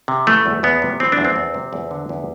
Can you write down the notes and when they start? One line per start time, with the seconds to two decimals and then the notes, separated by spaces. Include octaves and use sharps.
0.08 C3
0.27 E3 A3
0.46 E2
0.63 E2 B3
0.82 C3
1.00 E3 C4
1.12 D4
1.17 E2
1.25 C4
1.36 E2
1.54 C3
1.73 E2
1.91 D3
2.09 E2